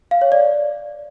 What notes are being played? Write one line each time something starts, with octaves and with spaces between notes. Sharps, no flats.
F5
C#5
D5